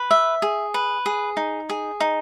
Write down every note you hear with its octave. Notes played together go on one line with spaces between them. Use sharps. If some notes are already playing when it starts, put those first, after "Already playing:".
Already playing: B4
E5
G#4
B4
G#4
D#4
G#4
D#4